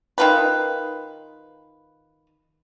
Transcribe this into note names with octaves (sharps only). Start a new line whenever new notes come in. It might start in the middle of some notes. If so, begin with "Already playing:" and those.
D#3 F4 B4